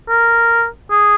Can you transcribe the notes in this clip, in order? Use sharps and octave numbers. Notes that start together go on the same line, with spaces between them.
A#4
G#4